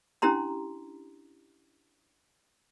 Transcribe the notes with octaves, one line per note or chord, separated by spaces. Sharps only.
C#4 D4 E4 G4 A#5 C6